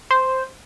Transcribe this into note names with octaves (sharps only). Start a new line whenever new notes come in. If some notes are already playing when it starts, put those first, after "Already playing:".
C5